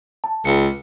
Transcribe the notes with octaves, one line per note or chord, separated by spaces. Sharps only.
A5
C#2 C#7